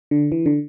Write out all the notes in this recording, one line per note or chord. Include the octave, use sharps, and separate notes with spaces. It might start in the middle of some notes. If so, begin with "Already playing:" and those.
D3
E3
D3